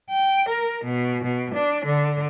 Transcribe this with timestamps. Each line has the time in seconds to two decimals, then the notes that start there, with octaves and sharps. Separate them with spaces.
0.10 G5
0.49 A#4
0.84 B2
1.23 B2
1.54 D4
1.85 D3